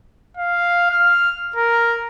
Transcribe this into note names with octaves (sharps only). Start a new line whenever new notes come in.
F5
F6
A#4